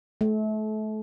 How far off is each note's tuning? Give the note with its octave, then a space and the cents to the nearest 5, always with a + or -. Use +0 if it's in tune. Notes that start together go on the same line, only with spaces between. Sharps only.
A3 -30